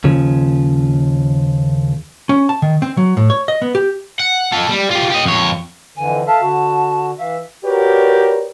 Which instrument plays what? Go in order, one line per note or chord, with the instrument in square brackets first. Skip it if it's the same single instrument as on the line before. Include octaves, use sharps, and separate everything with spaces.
[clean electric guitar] D#2 C#3 F3
[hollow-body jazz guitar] C#4
A5
D#3
C4
F#3
A2
C#5
D#5
B3
G4
[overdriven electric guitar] F#5
F4 A4
G3
F4 G4
G4 D#5
F2 C#5
[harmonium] F2 D3 E3 [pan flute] G#5
[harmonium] A4 E5 F5 [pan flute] A5
[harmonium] D3 F#4
[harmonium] E3 E5 [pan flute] F5
[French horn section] F#4 G4 A#4 B4 C#5 D5